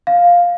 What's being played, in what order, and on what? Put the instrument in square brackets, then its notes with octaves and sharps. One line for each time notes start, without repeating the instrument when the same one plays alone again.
[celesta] F5